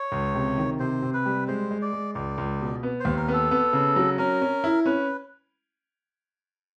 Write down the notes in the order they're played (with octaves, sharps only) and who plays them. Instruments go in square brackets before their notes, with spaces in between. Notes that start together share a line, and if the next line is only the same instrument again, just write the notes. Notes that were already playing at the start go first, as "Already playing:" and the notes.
Already playing: [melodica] C#5
[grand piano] C#2
C3
D#3
[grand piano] C3 [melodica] C5
[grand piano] C3
[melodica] B4
[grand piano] G3
[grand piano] G#3 [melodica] C5
[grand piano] G#3
[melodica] D5
[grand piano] G#3
[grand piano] C#2 [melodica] D5
[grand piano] C#2
B2
B3
[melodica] C5
[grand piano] D#2
[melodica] A#4
[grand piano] B3
[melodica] A4
[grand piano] B3
C#3
F#3
[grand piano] C#4 [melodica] A#4
[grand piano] C#4
E4
[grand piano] C#4 [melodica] B4